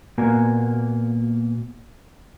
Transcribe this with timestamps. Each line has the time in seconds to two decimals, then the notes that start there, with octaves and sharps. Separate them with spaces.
0.18 A#2 A#3 B3 F#4 A#4 G#5